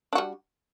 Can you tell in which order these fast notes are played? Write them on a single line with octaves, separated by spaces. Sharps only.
D4 F#4 G3